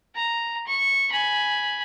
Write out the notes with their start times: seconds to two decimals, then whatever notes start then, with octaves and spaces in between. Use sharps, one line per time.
0.15 A#5
0.67 C#6
1.13 G#5 B5